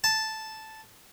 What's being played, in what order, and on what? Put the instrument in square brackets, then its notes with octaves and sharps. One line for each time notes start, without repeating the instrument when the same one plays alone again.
[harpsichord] A5